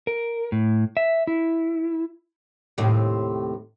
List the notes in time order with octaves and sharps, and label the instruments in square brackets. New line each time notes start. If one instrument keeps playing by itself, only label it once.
[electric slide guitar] A#4
A2
E5
E4
[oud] D#2 A2 C3